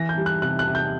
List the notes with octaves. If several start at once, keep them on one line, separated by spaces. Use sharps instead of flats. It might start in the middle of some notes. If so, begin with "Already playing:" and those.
Already playing: E3 A#6
G6
G3
F#6
C3 F#6
F#6
C3
G6